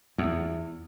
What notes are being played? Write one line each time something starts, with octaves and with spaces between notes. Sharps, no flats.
E2